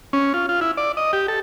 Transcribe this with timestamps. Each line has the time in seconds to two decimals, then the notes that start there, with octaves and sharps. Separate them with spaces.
0.13 C#4
0.34 F4
0.49 F4
0.61 E4
0.77 D5
0.97 D#5
1.13 G4
1.28 A4